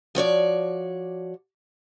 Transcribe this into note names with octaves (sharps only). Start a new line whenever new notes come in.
F3 F#4 C#5 D5